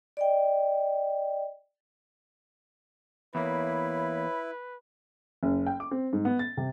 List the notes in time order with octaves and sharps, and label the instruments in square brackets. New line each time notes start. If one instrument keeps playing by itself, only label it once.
[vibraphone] D5 D#5 G5
[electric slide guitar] E2 A#3 [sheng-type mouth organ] E4 [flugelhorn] B4 [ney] C#5
[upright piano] F#1
G5
D6
C4
G#2
B3
A6
C3